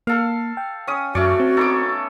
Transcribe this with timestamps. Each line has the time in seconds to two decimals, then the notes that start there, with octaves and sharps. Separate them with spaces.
0.07 A#3 A4 F5
0.57 G5
0.87 C#4 D#6
1.15 F#2 A3 C#4 F#4 D5 C#6
1.40 C4
1.57 B3 C#4 D#4 A4 D6